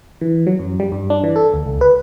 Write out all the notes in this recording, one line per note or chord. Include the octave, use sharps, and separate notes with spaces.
E3
F#3
F#2
G3
G2
D4
E3
A4
D2
C#2
B4